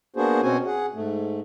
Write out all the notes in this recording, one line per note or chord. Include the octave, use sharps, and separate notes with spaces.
A#3 B3 D4 F#4 G#4 C5
B2 C4 C#4 F#4 G#5
G#4 F#5
G#2 A3